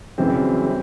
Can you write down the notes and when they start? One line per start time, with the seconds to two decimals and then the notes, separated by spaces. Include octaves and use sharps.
0.18 F#2 C#3 E3 G3 C4
0.67 C4